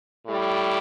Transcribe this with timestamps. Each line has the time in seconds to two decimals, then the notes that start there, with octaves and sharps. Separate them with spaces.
0.25 A2 G3